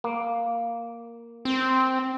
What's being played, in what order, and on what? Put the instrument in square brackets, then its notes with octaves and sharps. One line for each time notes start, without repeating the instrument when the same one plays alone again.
[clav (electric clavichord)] A#3
[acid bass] C4